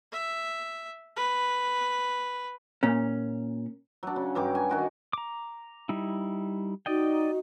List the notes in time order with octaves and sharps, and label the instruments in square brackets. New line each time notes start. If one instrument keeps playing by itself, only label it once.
[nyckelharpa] E5
B4
[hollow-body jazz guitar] A#2 C#4
[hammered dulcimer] F#3 D4
C#3
G2 F#3 G4 D6
G#5
D#3 F#4 D6
[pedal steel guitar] A#5 D6
G3 D#4 E4
[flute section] D#4 F#4 [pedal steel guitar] D5 D#5 G5